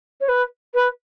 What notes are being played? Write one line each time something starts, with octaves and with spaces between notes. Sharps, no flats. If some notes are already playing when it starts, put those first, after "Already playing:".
C#5
B4
B4